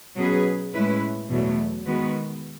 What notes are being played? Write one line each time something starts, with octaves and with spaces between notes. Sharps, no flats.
B2 F#3 C#4 G#4 B4
A2 G#3 C#4 E4 B4
E2 B2 F#3 A3
D#3 G#3 B3 F#4 B4